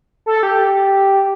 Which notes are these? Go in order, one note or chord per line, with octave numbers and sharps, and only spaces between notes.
A4
G4